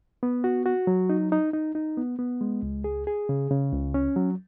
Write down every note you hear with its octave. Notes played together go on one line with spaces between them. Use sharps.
B3
F#4
F#4
F#3
D#4
D#4
D#4
D#4
B3
B3
G#3
C#2
G#4
G#4
C#3
C#3
C#2
C#4
F#3